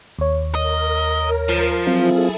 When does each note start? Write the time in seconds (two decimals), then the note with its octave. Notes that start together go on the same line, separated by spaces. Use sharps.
0.19 D#2 C#5
0.55 A#4 D#5
1.49 F3
1.87 F#3 C4 E4 F4 G#4 A4